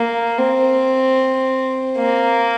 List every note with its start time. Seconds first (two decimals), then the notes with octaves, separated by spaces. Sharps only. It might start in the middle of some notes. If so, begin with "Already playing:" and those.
Already playing: A#3
0.38 C4
1.98 A#3